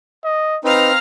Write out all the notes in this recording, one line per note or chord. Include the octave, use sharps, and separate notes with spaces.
D#5
C4 D#4 B4 F5 A#5 F6